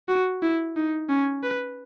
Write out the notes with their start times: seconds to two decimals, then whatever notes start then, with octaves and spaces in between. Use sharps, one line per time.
0.09 F#4
0.42 E4
0.77 D#4
1.09 C#4
1.43 B4